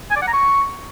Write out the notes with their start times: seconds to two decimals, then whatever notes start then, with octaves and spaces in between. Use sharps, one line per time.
0.11 G#5
0.16 D5
0.22 F#5
0.28 A#5
0.33 C#6